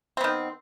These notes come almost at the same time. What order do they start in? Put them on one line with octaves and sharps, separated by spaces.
C4 B3 D#3